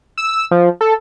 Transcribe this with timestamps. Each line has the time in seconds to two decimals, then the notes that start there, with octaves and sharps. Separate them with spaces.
0.18 E6
0.51 F3
0.81 A4